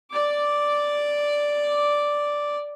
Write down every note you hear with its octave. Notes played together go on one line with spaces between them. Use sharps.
D5 D6